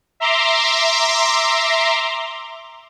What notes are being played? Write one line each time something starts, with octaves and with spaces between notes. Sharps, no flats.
E5 A#5 C6 D6